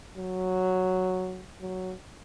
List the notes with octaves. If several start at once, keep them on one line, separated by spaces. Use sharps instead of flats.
F#3
F#3